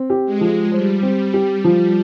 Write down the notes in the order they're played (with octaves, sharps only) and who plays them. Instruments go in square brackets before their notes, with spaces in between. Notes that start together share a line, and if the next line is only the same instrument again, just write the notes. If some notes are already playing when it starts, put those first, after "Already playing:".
Already playing: [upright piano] C4
G4
[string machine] G#3
[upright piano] F3
[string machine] G3 [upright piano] C5
[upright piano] C4
G4
F3